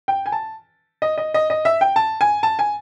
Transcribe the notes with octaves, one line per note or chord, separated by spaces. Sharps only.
G5
G#5
A5
D#5
D#5
D#5
D#5
E5
G5
A5
G#5
A5
G#5